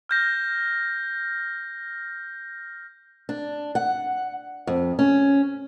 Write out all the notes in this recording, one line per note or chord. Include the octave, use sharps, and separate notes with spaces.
F6 G6 A#6
D4
F#5
F2
C#4